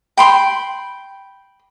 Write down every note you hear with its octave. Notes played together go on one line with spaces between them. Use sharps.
G5 B5 C6